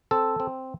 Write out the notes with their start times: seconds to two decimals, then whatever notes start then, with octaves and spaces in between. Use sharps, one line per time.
0.11 C4 A4
0.40 C4